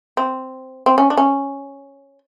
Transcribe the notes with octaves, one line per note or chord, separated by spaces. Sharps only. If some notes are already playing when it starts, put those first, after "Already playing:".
C4
C4
C#4
D4
C#4